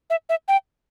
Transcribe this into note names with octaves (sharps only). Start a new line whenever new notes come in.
E5
E5
G5